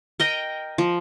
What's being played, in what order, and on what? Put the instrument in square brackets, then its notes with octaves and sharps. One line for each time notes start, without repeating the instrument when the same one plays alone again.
[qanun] A#4 D#5 G5
F3